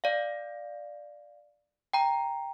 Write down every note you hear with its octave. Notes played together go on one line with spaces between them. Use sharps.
D5 F5
G5 A#5